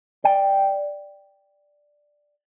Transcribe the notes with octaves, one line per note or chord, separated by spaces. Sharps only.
D5 G5